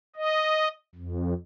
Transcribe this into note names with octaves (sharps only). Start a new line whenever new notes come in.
D#5
F2